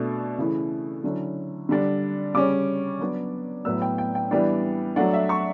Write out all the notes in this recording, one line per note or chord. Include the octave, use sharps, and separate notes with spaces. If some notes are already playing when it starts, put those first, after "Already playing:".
Already playing: B2 A3 D4
C#3 E3 A3 E4
D3 F#3 C#4 E4
D3 G3 D4
C#3 G3 C#4 D6
F#3 B3 D4
A2 F#3 B3 E6
G5
G5
G5
E3 G3 B3 D4
F#3 A3 D4 F#5
E5
C#6